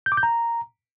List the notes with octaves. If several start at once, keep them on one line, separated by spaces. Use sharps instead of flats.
G6
D6
G6
A#5